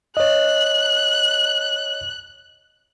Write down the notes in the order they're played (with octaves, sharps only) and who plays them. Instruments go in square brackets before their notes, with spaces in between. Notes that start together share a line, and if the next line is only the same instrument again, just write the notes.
[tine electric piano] C#5 D#5 [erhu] F#6